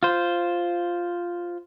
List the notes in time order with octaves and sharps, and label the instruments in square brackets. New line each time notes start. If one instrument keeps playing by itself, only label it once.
[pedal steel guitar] F4 C5